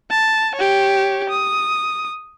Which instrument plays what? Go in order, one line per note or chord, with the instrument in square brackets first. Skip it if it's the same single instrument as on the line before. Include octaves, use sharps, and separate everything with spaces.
[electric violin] A5
G4 C#5
D#6